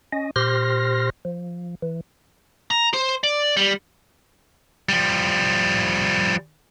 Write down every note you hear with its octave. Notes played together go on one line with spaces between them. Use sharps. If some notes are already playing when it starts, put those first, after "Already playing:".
C#4 D#5
A#2 G4 C5 C6 F6 A#6
F3
E3
A#5
C5
D5
G3
F3 G3